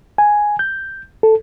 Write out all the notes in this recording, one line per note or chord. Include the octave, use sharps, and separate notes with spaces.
G#5
G6
A4